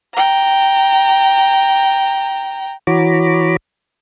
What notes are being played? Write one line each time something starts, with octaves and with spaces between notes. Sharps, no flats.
G5 A#5
E3 F#4 C#5 A#5 B5 D6